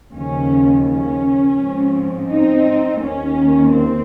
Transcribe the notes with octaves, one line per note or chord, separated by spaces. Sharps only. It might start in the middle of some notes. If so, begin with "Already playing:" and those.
D#2 C#3 F3 C#4
C#4
G#2 F3 C4
C4 D#4
D#2 D#3 A#3 C#4
C4